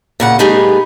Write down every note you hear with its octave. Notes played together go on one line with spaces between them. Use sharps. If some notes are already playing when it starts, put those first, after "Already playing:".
A#2 C#3 F#5
G3 A3 B3 D#4 G4 G#4